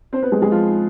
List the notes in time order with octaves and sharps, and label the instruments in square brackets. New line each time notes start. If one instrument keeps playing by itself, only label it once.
[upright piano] C4 C5
B3 B4
G#3 G#4
G#3 G#4
F3 F4